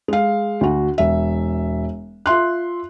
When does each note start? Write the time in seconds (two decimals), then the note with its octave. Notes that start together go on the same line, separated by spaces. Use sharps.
0.08 G#3 F5
0.61 D2 F#4
0.98 E1 E5
2.26 F4 E5 C6 F#6